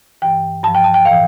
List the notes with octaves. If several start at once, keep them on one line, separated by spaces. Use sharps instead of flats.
G2 E3 G5
G2 F3 A5
G5
A5
G5
A2 E3 F5